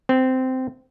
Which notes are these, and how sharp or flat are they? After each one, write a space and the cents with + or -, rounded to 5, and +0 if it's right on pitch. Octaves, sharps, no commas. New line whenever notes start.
C4 -15